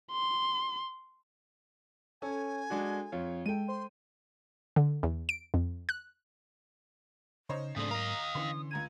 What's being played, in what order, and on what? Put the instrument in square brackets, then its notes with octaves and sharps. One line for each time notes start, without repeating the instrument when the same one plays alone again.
[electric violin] C6
[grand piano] C#4 [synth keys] A4 [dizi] G#5
[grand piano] G#3 D4 F#4
F2 F4 C#5
[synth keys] G#3 A4 [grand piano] G5 D#7
[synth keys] C5 [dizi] C6
[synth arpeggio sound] D3
E2
D7
F2
F#6
[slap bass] C#3 [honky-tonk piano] D#4 C5 C#5
[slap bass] G#2 F#3 A#3 [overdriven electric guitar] C#3 C4 [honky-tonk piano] A3 D4 [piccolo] D#6
[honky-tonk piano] A#4 F7 [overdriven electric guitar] D#5 F5
[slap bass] D3 C#4 [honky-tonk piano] E3 C6
[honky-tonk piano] C#2 A#5 D#7 [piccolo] G#6